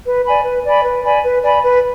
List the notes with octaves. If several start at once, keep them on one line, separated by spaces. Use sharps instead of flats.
B4
D5 G#5 B5
B4
D5 G#5 B5
B4
D5 G#5 B5
B4
D5 G#5 B5
B4